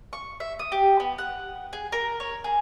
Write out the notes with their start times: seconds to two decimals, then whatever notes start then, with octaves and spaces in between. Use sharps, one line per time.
0.13 C#6
0.40 E5
0.59 D#6
0.72 G4
1.00 B3
1.18 F#5
1.73 G#4
1.92 A#4
2.20 C#5
2.44 G#4